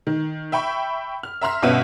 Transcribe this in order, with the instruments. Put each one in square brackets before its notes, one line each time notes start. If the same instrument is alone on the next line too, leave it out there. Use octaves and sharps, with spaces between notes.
[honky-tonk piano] D#3
E5 G5 B5 C#6
F6
E5 A#5 C6 F6
G1 B2 B3 C#4 E5 D#7